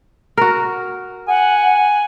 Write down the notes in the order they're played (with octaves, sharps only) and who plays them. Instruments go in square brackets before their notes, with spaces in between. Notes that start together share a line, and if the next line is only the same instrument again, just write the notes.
[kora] F#4 A#4
[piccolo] F#5 [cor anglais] G#5